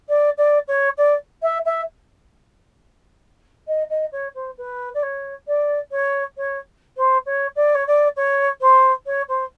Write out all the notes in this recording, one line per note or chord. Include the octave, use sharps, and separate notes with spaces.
D5
D5
C#5
D5
E5
E5
D#5
D#5
C#5
C5
B4
D5
C#5
D5
C#5
C#5
C5
C#5
D5
C#5
D5
C#5
C5
C#5
C5